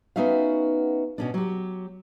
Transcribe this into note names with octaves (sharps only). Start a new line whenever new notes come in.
B3 C#4 D#4 F#4 E5 F5
B2 C#4 D4
F#3 G4